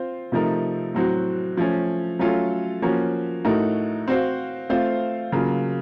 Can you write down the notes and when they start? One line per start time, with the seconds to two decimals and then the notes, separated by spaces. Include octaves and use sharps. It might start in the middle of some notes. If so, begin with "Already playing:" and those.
Already playing: C4 F4 C5
0.32 C3 F3 A3 D#4 A#4
0.95 A2 F#3 C4 F#4
1.57 F3 A3 C#4
2.19 F#3 A3 C#4 F4 A4
2.82 F3 A#3 C#4 F#4
3.45 A2 A3 D#4 F#4 A#4
4.08 C4 F#4 C5 F5
4.70 A3 C4 F4 C5 F5
5.32 C#3 F#3 A#3 F4